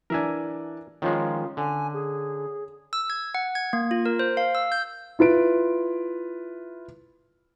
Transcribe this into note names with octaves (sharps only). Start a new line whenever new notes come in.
E3 D4 A#4 E5 G#5
D#3 F3 G#3 C#4 F4
D3 G#5
G#4
E6
G#6
F#5
G#6
A#3
F4
A#4
C5
F5
E6
G6
E4 F4 B4 D7